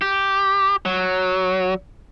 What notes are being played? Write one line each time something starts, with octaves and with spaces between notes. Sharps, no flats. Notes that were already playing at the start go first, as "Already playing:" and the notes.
G4
F#3